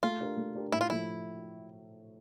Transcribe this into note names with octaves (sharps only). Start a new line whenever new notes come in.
A3 F4
D4 G4 A#4
A3
D4 G4 A#4
A2 E4
F4
F3 A3 E4